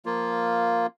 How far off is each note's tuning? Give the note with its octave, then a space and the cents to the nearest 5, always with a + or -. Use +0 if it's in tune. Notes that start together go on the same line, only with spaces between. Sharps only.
F3 +0 A#3 +0 F4 +0